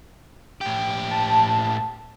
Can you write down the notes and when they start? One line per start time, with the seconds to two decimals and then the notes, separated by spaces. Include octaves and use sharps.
0.61 A2 G4
1.11 A5